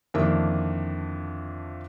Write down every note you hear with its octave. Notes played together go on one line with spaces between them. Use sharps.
F2 D3 D#3 A#3 D4 E4